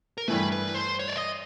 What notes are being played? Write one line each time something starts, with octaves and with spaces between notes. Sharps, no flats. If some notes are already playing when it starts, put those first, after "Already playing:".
A#4
G2 E3 A3 B4
B4
C5
C#5
D5
D#5